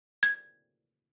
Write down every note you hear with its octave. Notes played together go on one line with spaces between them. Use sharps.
G#6